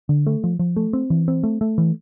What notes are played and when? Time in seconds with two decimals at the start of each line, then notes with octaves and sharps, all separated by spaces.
0.09 D3
0.26 A3
0.44 F3
0.59 F3
0.76 A3
0.93 C4
1.10 E3
1.28 C4
1.43 A3
1.61 A3
1.78 E3